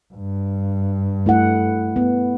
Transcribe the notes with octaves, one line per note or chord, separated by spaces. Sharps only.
G2
A3 E4 F#5
B3